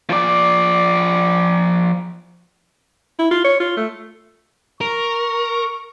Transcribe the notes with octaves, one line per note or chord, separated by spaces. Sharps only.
F3 D5
E4
F4
C#5
F4
A3
A#4 C#6